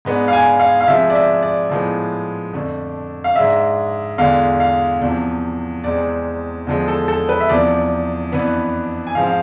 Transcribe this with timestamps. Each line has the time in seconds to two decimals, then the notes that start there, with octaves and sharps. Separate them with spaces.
0.05 G#2 G#3 B3 D4
0.28 F5
0.33 G#5
0.60 F5
0.81 F5
0.88 C3 F3 G#3 E5
1.10 D5
1.15 E5
1.43 D5
1.70 A2 F3 G#3 B3
2.53 F2 D3 A3 D4
3.24 F5
3.35 G#2 G#3 D4 E5
4.18 E2 D3 G#3 F5
4.60 F5
5.02 E2 C3 F3
5.84 E2 C3 G#3 C4 D5
6.67 E2 D3 F3 G#3
6.88 A4
7.08 A4
7.29 B4
7.40 E5
7.49 E2 C3 F3 D5
8.32 F2 E3 B3 D4
9.07 G#5
9.15 G#2 F3 G#3 C4 F5
9.27 F5